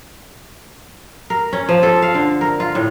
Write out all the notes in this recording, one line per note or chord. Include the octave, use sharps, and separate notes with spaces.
A#4
C#4
F3
A4
F5
D3
A#4
F4
A2